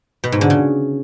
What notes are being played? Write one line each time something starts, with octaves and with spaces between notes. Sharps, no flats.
B2
G#2
D3
C#3